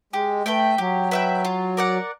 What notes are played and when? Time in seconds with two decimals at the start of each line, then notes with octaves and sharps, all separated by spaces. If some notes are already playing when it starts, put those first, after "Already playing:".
0.13 G#3 G4
0.45 A3 B4 E5 G5
0.78 F#3 G4
1.11 B4 E5 G5
1.45 F4
1.77 A#4 D5 F#5